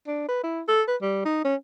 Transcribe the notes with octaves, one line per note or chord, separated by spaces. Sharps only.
D4
B4
E4
A4
B4
G3
D#4
C#4